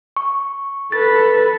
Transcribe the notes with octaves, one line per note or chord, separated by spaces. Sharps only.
C#6
A4 B4 A6